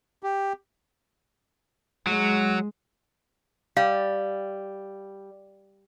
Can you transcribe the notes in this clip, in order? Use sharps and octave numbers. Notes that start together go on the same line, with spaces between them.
G4
F#3 G#3
G3 F5